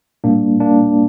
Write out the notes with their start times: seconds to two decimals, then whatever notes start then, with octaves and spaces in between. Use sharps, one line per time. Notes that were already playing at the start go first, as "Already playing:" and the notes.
0.24 A#2 G3 A#3 D4
0.60 A#3 D4